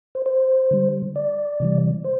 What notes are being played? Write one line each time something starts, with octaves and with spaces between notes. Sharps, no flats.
C5
C5
D3 G3
D5
C3 E3 G3
C5